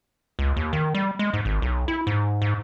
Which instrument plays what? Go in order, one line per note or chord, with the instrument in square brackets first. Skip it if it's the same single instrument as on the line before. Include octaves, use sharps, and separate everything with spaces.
[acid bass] C#2
D#2
D#3
G3
G#3
G#2
G#1
B1
E4
G#2
G#2